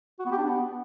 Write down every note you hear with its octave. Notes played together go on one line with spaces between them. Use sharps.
F#4
B3
G4
D4
B3